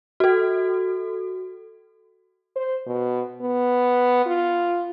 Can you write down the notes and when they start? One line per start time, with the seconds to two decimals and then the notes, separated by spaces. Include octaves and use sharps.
0.20 F#4 A4
2.56 C5
2.86 B2
3.41 B3
4.26 F4